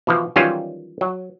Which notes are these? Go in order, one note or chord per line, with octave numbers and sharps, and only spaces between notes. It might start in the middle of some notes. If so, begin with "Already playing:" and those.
B2 E3 F3
D#3 E3 F#3 G3 C#4 F4
F#3